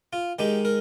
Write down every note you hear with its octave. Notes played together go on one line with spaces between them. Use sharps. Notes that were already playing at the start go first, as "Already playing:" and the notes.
F4
D#3 G#3 D#4 G4
A#4